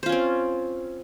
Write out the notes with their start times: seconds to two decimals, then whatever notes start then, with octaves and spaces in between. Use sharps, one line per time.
0.03 C5
0.06 F4
0.09 C#4
0.12 C4